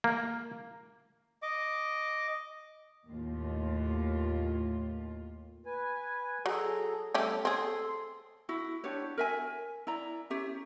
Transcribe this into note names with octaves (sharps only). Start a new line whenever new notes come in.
A#3
D#5 D6
D#2 A2 F4
B4 G#5
F#3 G#4 A4 A#5
G3 A3 C4 C#4 G4 A4
C4 G#4 A4 C6
E4 F#4
D4 F#4 G4 C#5
A#4 E5 G#5
E4 D5 A#5
C#4 G4 E5